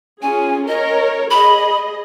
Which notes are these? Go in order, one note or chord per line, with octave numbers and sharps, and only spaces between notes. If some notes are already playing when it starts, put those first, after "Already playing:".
C#4 F4 G#4 G#5
A#4 C#5 D#5
G#4 D#5 B5